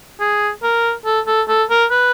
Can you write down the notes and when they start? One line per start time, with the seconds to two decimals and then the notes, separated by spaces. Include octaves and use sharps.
0.20 G#4
0.63 A#4
1.05 A4
1.27 A4
1.49 A4
1.70 A#4
1.91 B4